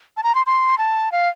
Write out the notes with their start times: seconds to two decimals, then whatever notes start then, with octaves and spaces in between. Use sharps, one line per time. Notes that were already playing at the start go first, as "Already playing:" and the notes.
0.17 A5
0.23 A#5
0.35 C6
0.47 C6
0.78 A5
1.12 F5